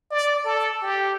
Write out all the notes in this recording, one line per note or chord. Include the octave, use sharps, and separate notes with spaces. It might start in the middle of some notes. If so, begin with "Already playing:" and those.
D5
A4
G4